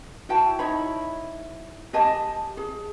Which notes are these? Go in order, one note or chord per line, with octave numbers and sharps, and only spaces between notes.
E4 F#4 G5 A5
D#4 E4 C#5 B5
G4 D#5 G#5 A5
G#4